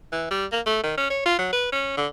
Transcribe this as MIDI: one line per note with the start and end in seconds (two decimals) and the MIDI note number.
0.12 0.29 52
0.31 0.46 55
0.52 0.60 58
0.66 0.83 57
0.83 0.95 51
0.97 1.09 61
1.10 1.22 73
1.25 1.38 65
1.39 1.50 54
1.53 1.70 71
1.72 1.95 61
1.97 2.07 50